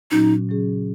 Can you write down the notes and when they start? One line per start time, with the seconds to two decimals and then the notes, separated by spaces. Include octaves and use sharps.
0.11 A#2 F#3 C#4 D#4 F#4
0.49 C#3 F#3 C#4 G#4